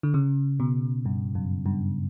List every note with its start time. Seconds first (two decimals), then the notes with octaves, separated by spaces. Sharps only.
0.03 D3
0.14 C#3
0.60 B2
1.05 G2
1.35 F#2
1.66 G2